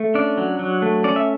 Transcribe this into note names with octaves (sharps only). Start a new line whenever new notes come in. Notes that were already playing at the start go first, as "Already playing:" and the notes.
Already playing: A3
C#4 D4 D5
F#3
F#3
A3
C#4 D5
E5